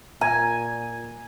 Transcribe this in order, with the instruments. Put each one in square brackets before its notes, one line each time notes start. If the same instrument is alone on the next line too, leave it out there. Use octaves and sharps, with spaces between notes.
[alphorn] A#2 [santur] G#5 [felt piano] A#5